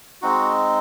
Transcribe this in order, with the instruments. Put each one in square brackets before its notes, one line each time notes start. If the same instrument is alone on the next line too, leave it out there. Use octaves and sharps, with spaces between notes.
[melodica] G#3 C4 D#4 F#4